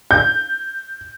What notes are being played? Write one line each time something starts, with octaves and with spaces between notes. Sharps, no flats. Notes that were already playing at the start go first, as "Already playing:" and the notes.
G6